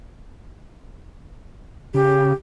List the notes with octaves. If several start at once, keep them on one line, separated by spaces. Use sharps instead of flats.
C#3 G4